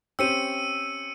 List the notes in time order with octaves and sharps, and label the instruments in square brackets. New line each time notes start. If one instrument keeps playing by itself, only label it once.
[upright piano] C4 C#4 G4 [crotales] E6 C#7 D#7